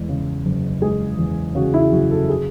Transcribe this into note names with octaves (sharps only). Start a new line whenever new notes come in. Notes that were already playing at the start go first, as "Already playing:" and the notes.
Already playing: E2 G#3
C#3
F#1
G#3 G#4
E2
C#3 F#4
E4
F#1 F#4
A4
G#4